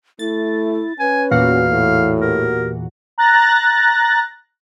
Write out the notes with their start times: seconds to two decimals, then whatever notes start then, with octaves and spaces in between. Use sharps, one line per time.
0.19 A3 E4 A6
0.99 C#4 B4 G#5
1.31 E2 A#2 F#4 F5
1.69 A2
2.21 G4 A#4
3.18 A#5 F#6 A6 A#6